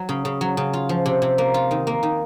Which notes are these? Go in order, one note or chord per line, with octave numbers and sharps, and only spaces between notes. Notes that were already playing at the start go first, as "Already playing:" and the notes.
Already playing: F#3
C#3
C#3
F#3
C#3
F4
F3
C3
C3
A#3
F4
D#3
A#3
D#3